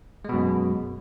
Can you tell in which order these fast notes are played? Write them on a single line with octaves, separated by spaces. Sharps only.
G#3 B2 F#2